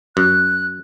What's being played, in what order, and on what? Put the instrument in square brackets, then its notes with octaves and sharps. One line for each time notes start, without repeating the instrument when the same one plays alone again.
[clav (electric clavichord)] F#2 [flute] F#6